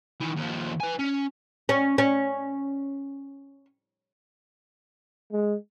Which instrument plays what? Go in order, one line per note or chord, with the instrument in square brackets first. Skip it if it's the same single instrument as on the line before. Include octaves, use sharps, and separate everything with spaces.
[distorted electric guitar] D#3 E3
D#2 F3
B4 G#5
C#4
[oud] C#4
C#4
[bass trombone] G#3